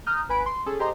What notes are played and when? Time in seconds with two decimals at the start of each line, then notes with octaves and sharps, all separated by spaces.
0.06 A#5 D#6 F6 G6
0.29 G#1 B4 G#5 B5 D7
0.46 C6
0.66 C#4 G#4 A4
0.79 G4 G#4 C5 D#5 A#5 C6